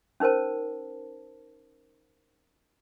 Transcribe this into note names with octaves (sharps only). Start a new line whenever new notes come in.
C#4 D#4 A#4 C5 A5